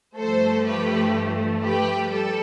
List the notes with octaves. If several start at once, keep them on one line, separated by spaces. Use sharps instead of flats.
G2 F3 A3 A4 C5
G4 B4
G4 B4
G3 A4